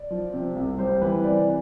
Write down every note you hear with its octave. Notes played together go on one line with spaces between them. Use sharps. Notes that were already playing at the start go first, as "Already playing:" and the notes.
Already playing: D5
F3
C3
C2
G3 C5
E3 B4
C3 D5